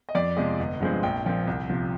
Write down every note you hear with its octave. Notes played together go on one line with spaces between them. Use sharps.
D#5
F2 D5
C3 F3 G#3 D#5
G1
G2 F3 G#3 C4
A#1 G5
A#2 F3 C4
C2
C3 F3